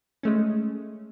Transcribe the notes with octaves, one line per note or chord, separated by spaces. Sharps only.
G#3 A3 C#4